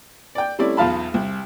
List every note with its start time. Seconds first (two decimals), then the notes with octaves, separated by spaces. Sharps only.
0.35 D5 G5
0.59 G3 A3 C4 C#4 E4 D5
0.77 B1 E2 F4 F5 A5 B5
1.14 C2